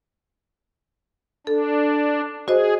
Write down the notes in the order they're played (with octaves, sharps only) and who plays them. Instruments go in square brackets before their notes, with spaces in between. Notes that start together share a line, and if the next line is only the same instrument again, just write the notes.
[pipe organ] D4 [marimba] A4
[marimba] F#4 C5 D#5 [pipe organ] G#4